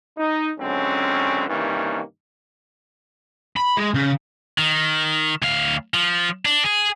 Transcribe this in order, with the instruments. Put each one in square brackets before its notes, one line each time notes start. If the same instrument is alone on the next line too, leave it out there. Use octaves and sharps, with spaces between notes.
[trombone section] D#4
C#2 F#2 D3 C4 C#4
G2 C3 D#3 E3 A#3 C#4
[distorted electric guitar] B5
G#3
C#3
D#3
D2 F5
F3
D4
G#4